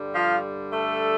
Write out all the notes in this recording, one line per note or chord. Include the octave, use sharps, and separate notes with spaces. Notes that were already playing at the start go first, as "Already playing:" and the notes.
Already playing: G2 D3 G3
F3 F4
A3 A4